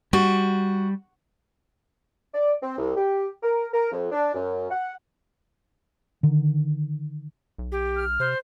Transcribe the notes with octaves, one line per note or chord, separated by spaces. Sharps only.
G3 F#4
D5
C4
C2
G4
A#4
A#4
F2
D4
F#2
F#5
D3 D#3
B1
G4
F6
C3 C5